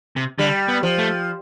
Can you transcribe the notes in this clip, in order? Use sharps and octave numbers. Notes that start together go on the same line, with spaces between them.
C3
D3 G3
B3
F3
A3